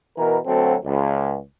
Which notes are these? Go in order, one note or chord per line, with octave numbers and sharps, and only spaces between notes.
B2 E3 A#4
D2 F#3 C4 A4
C#2